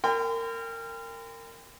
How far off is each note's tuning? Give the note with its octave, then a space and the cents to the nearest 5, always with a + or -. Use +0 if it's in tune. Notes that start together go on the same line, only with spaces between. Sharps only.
A#4 -25 G5 +35 C6 -45